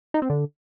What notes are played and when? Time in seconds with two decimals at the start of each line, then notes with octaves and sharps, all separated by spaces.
0.14 D#4
0.22 C4
0.30 D3